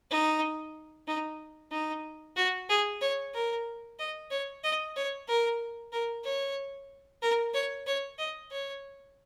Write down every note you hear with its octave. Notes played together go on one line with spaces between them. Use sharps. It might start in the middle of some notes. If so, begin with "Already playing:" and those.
D#4
D#4
D#4
F#4
G#4
C#5
A#4
D#5
C#5
D#5
C#5
A#4
A#4
C#5
A#4
C#5
C#5
D#5
C#5